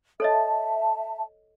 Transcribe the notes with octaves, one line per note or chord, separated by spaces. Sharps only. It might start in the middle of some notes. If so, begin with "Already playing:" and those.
A4 C#5 D#5 E5 A5